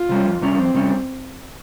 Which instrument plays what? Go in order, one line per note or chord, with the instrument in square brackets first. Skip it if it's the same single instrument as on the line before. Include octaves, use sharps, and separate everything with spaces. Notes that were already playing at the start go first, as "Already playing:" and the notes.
Already playing: [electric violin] F4
[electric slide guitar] C3 G3 C#4
F2
C3 G3 C#4
[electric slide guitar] F2 [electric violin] C4
[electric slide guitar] C3 G3 C#4